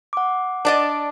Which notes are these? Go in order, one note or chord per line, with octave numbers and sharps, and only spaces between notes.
F#5 D6
D4 D5 D#5